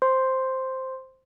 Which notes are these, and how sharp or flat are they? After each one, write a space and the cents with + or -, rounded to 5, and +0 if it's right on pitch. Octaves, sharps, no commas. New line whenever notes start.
C5 +0 C6 +0